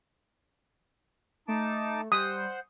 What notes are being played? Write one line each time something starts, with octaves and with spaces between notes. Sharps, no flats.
A3 D#4 A5 D6
G3 C5 F#5 D#6